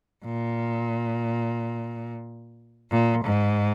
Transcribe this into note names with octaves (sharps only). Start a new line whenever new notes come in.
A#2
A#2
G#2